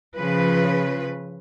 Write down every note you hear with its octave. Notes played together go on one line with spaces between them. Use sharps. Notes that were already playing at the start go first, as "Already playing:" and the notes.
C#3 F3 B4